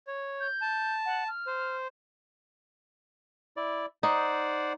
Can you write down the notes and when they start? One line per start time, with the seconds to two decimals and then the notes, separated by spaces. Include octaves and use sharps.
0.07 C#5
0.40 G6
0.62 A5
1.06 F#5
1.28 F6
1.47 C5
3.57 E4 D5
4.03 D#4 C5 D5 F#5